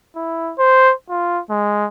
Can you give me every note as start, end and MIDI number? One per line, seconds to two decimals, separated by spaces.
0.16 0.53 64
0.59 0.93 72
1.09 1.40 65
1.50 1.87 56